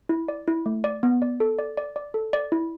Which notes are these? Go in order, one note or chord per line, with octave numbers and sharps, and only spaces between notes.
E4
D5
E4
A3
D5
B3
D5
A4
D5
D5
D5
A4
D5
E4